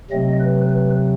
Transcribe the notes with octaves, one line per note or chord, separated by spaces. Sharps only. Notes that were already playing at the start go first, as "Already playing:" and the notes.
C3 F#3 A3 C4 D#5
B4
B4